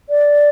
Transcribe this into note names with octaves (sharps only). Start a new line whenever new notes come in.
D5